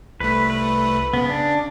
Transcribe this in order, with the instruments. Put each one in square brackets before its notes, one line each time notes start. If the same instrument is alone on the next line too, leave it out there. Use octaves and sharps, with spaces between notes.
[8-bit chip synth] C2 A3 [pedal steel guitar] B4
[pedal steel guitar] B4
[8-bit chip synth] C#3 [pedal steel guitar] B3
[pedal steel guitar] D4